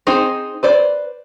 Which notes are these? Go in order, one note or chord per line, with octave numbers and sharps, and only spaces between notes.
C4 D#4 G#4 C5
B4 C5 D5